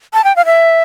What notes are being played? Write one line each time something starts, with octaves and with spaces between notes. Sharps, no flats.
A5
G5
F5
E5